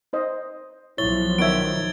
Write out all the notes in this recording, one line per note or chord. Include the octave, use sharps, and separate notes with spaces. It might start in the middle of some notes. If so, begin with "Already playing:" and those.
D#4 C5 D#5
B1 F3 E4 C#5 A6 G7
D#3 B3 C#5 E5 G#6 D7